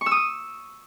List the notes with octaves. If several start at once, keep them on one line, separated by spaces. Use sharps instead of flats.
C#6
E6
D#6
E6